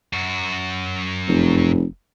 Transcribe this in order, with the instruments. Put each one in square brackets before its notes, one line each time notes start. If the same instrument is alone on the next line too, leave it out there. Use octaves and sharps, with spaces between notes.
[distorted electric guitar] F#2 F#4
[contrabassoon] F1